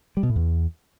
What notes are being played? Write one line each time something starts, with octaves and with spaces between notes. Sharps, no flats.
G3
B2
A2
E2